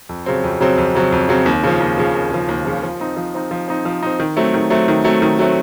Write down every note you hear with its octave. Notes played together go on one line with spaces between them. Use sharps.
F2
C#3 F#3 C4
F2
C#3 F#3 C4
F2
C#3 F#3 C4
F2
C#3 F#3 C4
D#2
C#3 F3
D#2
C#3 F3
D#2
C#3 F3
D#2
C#3 F3
F3
C4 D#4
F3
C4 D#4
F3
C4 D#4
F3
C4 D#4
D#3
F#3 A3 C4
D#3
F#3 A3 C4
D#3
F#3 A3 C4
D#3
F#3 A3 C4